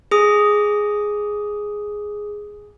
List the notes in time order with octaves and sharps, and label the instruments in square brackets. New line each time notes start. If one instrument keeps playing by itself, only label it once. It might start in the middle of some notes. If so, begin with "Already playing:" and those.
[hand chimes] G#4 D#6